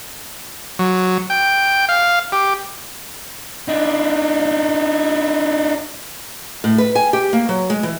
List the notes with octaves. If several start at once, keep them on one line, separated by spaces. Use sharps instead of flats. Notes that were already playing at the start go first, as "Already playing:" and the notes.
F#3
G5
F5
G4
D4 D#4
A2
B4
G#5
G4
A#3
F#3
G#3
E3